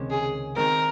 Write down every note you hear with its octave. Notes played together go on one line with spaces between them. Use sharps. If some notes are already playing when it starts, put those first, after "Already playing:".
Already playing: C#2 C3 D#3 G#3 C#4
G#4
D#3 G#3 C4 A#4